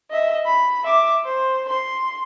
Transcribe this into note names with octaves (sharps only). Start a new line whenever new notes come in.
D#5 E5
B5
E5 D6
C5
C6